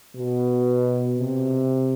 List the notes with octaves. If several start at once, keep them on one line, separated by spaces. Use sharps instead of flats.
B2
C3